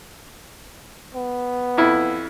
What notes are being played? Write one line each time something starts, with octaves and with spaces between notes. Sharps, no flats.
B3
F2 E4